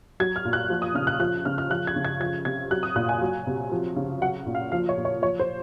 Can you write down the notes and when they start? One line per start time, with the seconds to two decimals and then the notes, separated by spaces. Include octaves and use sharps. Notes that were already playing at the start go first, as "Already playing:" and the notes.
0.20 F#3 G#6
0.36 F6
0.45 A#2
0.53 F#6
0.70 F3
0.82 D#6
0.95 C#3 F6
1.07 F#6
1.20 F3 F#6
1.45 C#3 F6
1.58 F6
1.70 F3 F#6
1.87 G#6
1.96 C#3
2.05 G#6
2.20 F3 G#6
2.45 C3 G#6
2.71 F#3 F#6
2.83 D#6
2.96 A#2 F#6
3.09 G#5
3.21 F#3
3.47 C3
3.72 F3
3.96 C#3
4.21 F#3 F#5
4.46 A#2
4.55 F5
4.72 F3 F5
4.89 C#5
4.98 A#2
5.05 C#5
5.22 F3 C#5
5.39 C5